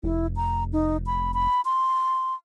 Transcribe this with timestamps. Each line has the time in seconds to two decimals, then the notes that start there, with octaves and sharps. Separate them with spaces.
0.04 F1 E4
0.36 A#5
0.73 D#4
1.06 B5
1.34 B5
1.65 C6